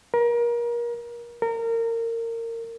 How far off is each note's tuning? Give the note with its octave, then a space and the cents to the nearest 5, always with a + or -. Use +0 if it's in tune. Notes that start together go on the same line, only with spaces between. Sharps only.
A#4 +30
A#4 -25